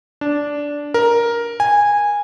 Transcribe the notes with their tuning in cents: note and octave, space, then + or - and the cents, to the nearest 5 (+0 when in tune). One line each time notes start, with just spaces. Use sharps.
D4 -10
A#4 +10
G#5 -15